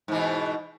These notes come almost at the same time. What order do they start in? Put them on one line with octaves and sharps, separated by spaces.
G#2 E3 B2